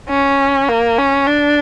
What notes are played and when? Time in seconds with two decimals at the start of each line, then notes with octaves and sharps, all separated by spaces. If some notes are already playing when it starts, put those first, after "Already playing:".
0.09 C#4
0.68 A#3
0.98 C#4
1.27 D4